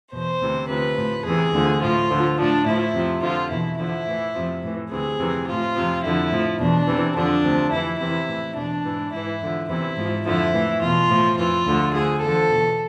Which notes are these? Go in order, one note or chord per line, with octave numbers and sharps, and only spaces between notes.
E2 B2 C5
D2 C3 E3
D2 C3 F3 B4
A2 F3
E2 C3 E3 G#4
D2 D3 F3
A2 F3 F4
D2 D3 F3
A2 F3 D4
A2 F3 E4
F2 C3 F3
F2 D3 F3 F4
E2 B2 E4
E2 D3 F3 E4
A2 E3
F2 C3 F3
A2 E3
D2 C3 E3 G#4
F2 C3 E3
A2 F3 F4
F2 C3 F3
F2 D3 F3 E4
A2 F3
E2 B2 D4
E2 C3 E3
F2 D3 F3 D4
D2 C3 F3
F2 E3 E4
E2 C3 E3 E4
A2 E3
E2 B2 D4
G#2 E3
G#2 E3 E4
E2 D3 F3
E2 C3 E3 E4
G#2 F3
F2 D3 F3 E4
A2 E3
E2 B2 F4
A2 F3
F2 E3 F4
D2 D3 F3
D2 D3 F3 G#4
E2 D3 F3 A4
E2 B2